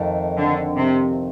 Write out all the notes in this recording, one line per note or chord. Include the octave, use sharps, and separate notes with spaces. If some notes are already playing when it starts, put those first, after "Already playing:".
Already playing: F2 D#3 A3 D#4
D3
C3